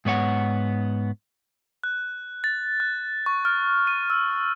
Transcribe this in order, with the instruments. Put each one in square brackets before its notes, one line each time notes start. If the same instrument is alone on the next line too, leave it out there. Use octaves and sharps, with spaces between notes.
[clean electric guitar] G#2 B3 C#5 F#5
[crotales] F#6
A6
F#6
C#6
F6
D#7
E6